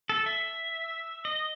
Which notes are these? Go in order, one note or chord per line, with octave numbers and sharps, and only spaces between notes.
A4
E5
D#5